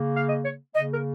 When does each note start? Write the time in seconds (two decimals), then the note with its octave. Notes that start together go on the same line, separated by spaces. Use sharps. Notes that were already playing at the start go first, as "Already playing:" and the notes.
Already playing: C#3 A#3
0.15 F5
0.27 D#5
0.43 C#5
0.75 C#3 A#3 D#5
0.91 A#4